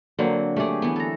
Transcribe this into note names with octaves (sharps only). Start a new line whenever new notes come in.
D3 F#3 A#3 C4
A3 G4 G#4 D5
E3 B3
A4 A#5